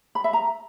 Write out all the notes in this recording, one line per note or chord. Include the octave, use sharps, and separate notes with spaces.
B5
E5
A#5